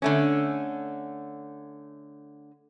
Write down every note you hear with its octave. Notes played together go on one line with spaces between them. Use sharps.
D3 A3 C#4